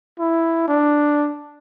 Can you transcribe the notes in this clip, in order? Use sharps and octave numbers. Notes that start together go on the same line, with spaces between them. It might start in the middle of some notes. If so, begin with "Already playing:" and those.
E4
D4